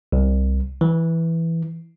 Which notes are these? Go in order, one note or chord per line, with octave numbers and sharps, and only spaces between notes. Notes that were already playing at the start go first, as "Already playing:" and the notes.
C2
E3